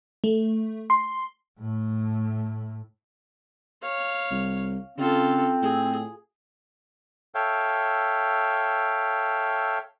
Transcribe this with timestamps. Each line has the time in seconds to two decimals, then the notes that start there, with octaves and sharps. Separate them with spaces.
0.24 A3
0.90 C6
1.59 A2 A3
3.82 C#5 F5
4.31 C2
4.98 C#3 C4 F4 A4
5.62 A2 G#4
7.35 A4 C#5 E5 F5 G5